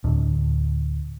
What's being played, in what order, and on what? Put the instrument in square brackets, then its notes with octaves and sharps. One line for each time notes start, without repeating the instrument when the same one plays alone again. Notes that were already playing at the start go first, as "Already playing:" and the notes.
[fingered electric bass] D1